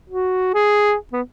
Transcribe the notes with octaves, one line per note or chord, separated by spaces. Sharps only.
F#4
G#4
B3